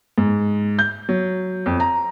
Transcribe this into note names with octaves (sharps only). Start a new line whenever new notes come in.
G#2
G6
F#3
F2
A#5